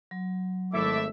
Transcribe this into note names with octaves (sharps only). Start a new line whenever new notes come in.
F#3
G#1 A3 E4 A4 E5 D6